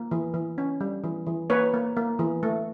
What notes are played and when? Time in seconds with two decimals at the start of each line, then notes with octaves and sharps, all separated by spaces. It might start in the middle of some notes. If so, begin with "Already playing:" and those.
Already playing: A#3
0.11 E3
0.34 E3
0.58 C#4
0.81 G3
1.04 E3
1.27 E3
1.50 A#3 B4 C#5
1.74 A#3
1.97 A#3
2.19 E3
2.43 A3